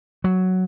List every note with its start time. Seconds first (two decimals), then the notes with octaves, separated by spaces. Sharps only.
0.24 F#3